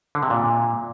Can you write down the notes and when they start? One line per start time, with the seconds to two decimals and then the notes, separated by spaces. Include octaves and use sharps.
0.15 D3
0.23 C3
0.30 A#2